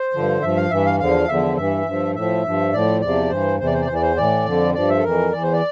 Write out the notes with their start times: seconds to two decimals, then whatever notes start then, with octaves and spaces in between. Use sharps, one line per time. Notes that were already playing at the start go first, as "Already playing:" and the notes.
Already playing: C5
0.13 G2 D3 F3
0.42 G2 F3 E5
0.56 F5
0.70 G2 E3 E5
0.86 F5
0.99 E2 D3 F3 F5
1.28 E2 D3 F3 E5
1.57 G2 E3 E5
1.86 G2 F3
2.15 A2 F3 E5
2.44 G2 F3
2.73 A2 F3 D5
3.01 E2 C3 F3 D5
3.30 G2 E3 C5
3.59 E2 C3 E3 C5
3.66 D5
3.74 C5
3.81 D5
3.87 E2 E3 C5
3.95 D5
4.02 C5
4.16 A2 E3 D5
4.45 F2 D3 F3
4.74 G2 F3 D5
4.89 E5
4.98 A4
5.03 F2 E3 A#4
5.33 E2 E3 D5
5.43 C5
5.53 D5